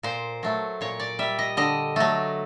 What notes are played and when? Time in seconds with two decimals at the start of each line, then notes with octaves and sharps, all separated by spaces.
0.03 A#2 C5
0.43 F#3 A3
0.81 A#2 C#5
1.00 D5
1.19 G3 E5
1.39 D#5
1.57 D3 D#5
1.96 F#3 A3